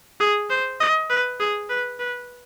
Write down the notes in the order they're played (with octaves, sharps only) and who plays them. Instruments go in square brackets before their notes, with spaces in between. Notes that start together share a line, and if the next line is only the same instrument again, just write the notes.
[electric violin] G#4
C5
D#5
B4
G#4
B4
B4